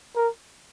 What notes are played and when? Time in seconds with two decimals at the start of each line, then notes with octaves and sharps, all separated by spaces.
0.16 A#4